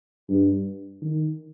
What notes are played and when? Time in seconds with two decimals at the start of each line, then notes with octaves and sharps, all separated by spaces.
0.29 G2
1.02 D#3